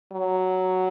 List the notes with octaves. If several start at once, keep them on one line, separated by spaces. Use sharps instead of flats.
F#3